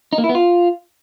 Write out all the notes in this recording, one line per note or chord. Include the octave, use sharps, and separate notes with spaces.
D#4
A#3
E4
B3
F4